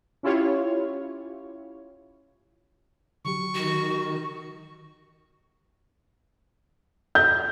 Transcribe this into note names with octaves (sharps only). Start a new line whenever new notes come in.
C#4 E4 F4 G4 C#5
D3 F#3 G4 C#6
D#3 F#4
G6